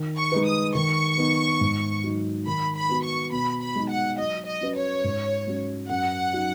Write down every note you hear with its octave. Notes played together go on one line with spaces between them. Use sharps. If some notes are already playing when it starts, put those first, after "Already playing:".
Already playing: D#3
C#6
G#3 D#4 B4
D#6
D#3 C#6
B3 D#4
G#2
F#3 D#4
D#3 B5
B5
B3 F#4 B4
C#6
B2 B5
B5
G#3 D#4
F#5
F#3 D#5
D#5
C#4 F#4 B4
C#5
G#2
G#3 C#4 F#4
F#2 F#5
F#3 D#4 F#4